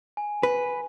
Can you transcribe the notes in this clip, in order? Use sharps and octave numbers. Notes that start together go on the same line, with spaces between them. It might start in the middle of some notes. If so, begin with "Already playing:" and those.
G#5
B4